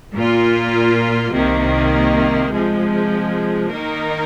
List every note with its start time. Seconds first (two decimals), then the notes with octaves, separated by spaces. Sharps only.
0.14 A#2 A#3 F4
1.34 C2 C3 D#3 A#3
2.52 C3 F3 G#3
3.72 D#3 A#3 D#4 A#4 D#5